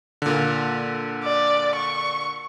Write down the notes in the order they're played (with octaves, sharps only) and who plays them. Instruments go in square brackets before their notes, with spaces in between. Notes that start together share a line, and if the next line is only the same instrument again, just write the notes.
[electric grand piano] A#2 D3
[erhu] D5
C#6